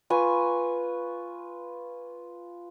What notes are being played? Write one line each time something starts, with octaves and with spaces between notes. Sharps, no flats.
F4 B4 G#5 C#6